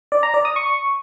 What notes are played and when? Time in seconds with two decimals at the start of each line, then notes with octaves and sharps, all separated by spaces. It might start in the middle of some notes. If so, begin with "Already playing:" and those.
0.12 D5
0.23 A#5
0.34 D5
0.45 D#6
0.56 C#6